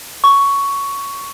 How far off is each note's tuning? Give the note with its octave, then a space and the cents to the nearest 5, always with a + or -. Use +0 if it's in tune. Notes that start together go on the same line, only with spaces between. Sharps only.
C#6 +10